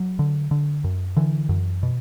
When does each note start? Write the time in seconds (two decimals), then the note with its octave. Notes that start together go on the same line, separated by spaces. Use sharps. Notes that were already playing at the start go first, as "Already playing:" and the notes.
Already playing: F#3
0.19 D3
0.51 D3
0.84 F#2
1.16 D3 E3
1.49 F#2
1.83 B2